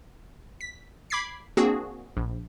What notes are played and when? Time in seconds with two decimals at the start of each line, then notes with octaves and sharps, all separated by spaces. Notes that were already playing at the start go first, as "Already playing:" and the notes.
0.61 B6
1.10 B5 D6 G#6 B6 C7
1.57 A#3 C4 D4 F#4 G#4
2.17 A#1